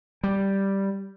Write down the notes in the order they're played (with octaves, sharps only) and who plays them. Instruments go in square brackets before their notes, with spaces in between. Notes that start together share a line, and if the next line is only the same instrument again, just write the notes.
[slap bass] G3